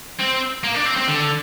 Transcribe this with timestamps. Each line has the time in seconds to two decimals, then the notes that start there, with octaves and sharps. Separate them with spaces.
0.20 C4
0.64 A#3
0.75 D4
0.86 C4
0.97 C4
1.08 D3